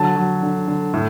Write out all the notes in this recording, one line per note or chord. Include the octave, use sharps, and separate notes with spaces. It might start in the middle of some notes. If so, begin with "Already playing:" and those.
Already playing: D3 F#3 A5
F#3
D3
D3
A2